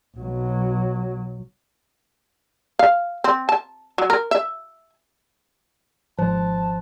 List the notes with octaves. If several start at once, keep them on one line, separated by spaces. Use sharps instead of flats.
B1 F#3
F5
C4
A5
F#3
A#4
E5
G#1 G#2 F3 C5 A5